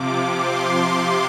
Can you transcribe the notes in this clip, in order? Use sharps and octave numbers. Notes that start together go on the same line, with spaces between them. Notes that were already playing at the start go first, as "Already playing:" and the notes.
Already playing: C3 F3 D6
C6
C6